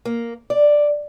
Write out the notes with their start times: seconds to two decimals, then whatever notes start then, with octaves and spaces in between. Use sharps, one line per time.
0.05 A#3
0.50 D5